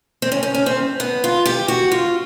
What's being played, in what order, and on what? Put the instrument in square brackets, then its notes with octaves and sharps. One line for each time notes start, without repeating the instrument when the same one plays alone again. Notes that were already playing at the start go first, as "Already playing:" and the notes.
[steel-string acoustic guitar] C4
C#4
C#4
C#4
C4
B3
F4
G4
F#4
F4